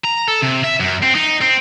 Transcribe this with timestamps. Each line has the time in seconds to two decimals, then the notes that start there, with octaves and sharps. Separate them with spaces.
0.05 A#5
0.28 A4
0.42 C3
0.64 E5
0.80 F#2
1.03 C4
1.15 D#4
1.42 C4